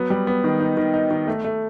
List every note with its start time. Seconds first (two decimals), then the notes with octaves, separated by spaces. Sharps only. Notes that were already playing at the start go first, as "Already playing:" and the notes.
Already playing: F#3 B3
0.10 G3
0.27 B3
0.44 D#3
0.60 D#4
0.77 D#3
0.94 D#4
1.11 D#3
1.27 A3
1.44 A3